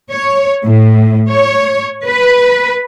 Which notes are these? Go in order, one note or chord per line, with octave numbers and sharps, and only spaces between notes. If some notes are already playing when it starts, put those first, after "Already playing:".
C#5
A2
C#5
B4